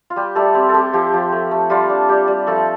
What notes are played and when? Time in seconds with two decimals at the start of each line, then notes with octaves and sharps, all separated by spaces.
0.10 F4
0.16 G3 G4
0.35 G3 A3 A4
0.54 C4 G4
0.69 A4
0.74 C4 G4
0.93 F3 G4
1.13 F3
1.33 A3
1.51 A3
1.70 G3 F4
1.89 D4
2.09 G3 G4
2.28 G3
2.47 F3 A3 A4